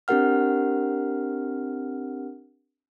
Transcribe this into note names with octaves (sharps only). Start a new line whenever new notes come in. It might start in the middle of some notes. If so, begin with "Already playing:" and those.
C4 D4 G4 A#4 F#5 F6